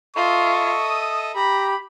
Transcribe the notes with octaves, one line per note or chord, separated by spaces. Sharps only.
F4 A4 D#5 E5 C#6
D#6
G4 A#5 B5